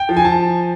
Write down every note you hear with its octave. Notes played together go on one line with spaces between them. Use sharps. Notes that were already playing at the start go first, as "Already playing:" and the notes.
Already playing: G5
F3
G#5
A5